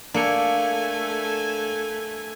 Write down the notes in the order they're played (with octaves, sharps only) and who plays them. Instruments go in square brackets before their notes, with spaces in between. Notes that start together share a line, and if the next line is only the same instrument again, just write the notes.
[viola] A3 G#5 [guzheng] A#3 [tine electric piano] D4 A4 C#7